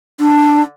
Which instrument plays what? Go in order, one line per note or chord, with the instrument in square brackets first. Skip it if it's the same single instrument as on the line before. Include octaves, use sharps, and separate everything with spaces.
[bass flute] D4